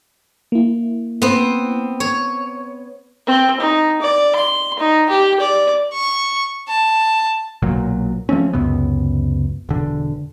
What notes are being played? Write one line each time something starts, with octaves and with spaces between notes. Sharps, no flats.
A#3 E4
B3 C4
C#5
C4
D#4
D5
C6
D#4
G4
D5
C#6
A5
B1 A#2 F#3
F3 A3 C4 C#4
C#2 F#2 C3 B3
E1 D3